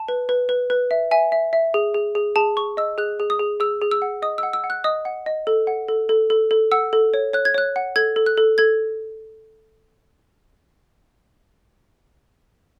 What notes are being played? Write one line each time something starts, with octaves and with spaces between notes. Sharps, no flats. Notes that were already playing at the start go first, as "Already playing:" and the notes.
Already playing: A5
B4
B4
B4
B4
E5
E5 G#5
E5
E5
G#4
G#4
G#4
G#4 A5
G#4 C#6
D#5 E6
G#4 F#6
G#4
D#6
G#4
G#4 E6
G#4
E6
F#5
D#5 D#6
F#5 E6
E6
F#5
F#6
D#5 D#6
F#5
D#5
A4
F#5
A4
A4
A4
A4
F#5 E6
A4
C#5
C#5 F#6
G#6
C#5 F#6
F#5
A4 G#6
A4
F#6
A4
A4 G#6